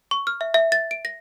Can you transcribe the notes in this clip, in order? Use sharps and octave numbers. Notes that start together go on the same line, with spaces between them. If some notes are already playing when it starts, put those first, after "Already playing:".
C#6
F6
E5
E5
A6
D7
A#6